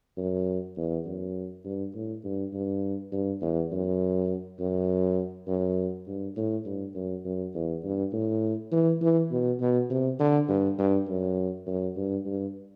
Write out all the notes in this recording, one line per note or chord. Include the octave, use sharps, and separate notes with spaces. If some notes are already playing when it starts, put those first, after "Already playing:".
F#2
E2
F#2
G2
A2
G2
G2
G2
E2
F#2
F#2
F#2
G2
A2
G2
F#2
F#2
E2
G2
A2
E3
E3
B2
B2
C3
D3
G2
G2
F#2
F#2
G2
G2